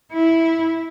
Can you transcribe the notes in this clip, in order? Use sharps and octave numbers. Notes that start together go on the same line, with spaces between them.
E4